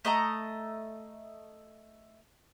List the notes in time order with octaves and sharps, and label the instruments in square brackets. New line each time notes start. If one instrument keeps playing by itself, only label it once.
[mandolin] A3 D#5 A5 A#5